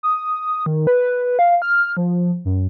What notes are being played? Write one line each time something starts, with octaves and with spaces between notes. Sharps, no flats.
D#6
D#3
B4
F5
F6
F3
F#2